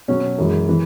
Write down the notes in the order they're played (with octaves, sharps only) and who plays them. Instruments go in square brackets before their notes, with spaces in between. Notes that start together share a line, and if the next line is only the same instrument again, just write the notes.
[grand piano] B2 F#3 C#4
F#2 E3 G#3
E3